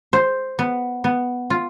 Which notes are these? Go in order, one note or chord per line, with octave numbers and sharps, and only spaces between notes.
C5
B3
B3
F4